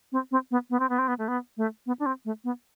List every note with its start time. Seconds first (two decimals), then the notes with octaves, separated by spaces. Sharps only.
0.12 C4
0.31 C4
0.51 B3
0.70 B3
0.80 C4
0.89 B3
0.99 C4
1.08 B3
1.19 A3
1.28 B3
1.57 A3
1.86 B3
2.00 D4
2.06 C4
2.25 A3
2.44 B3